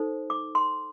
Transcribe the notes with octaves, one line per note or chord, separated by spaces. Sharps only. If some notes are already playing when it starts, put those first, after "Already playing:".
Already playing: D#4 A4 C5
D6
C6